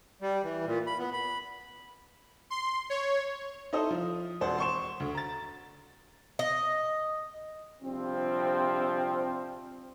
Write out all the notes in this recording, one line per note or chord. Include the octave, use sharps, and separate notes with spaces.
G3
E3
A#2
B5
B3
B5
C6
C#5
D#4 E4 A4 C5 D#5 D#6
F3
E1 C5 D5 F#5
C6 C#6 E7
D2
A#5 A6
D#5
A#1 C3 F3 G3 C4